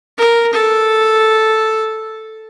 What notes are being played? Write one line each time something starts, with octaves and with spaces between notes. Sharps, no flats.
A#4
A4